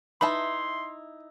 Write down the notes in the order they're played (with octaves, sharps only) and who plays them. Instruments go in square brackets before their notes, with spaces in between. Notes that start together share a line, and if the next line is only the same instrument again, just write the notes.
[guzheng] D#4 E4 [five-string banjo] B4 E5 A5 [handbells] B5 [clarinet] C6